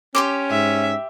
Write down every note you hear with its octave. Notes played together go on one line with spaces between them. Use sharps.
C#4 G4 C6 D6
G#2 E5